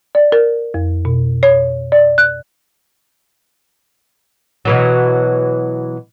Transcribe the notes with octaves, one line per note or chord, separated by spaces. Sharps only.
D5
A#4
F2
B2
C#5
D5
F#6
B2 E3 F#3